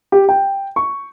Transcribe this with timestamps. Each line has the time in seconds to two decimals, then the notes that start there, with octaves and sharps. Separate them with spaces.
0.12 G4
0.29 G5
0.76 C#6